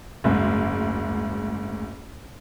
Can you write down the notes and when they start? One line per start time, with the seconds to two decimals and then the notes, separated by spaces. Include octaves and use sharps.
0.24 F#1 D2 G#2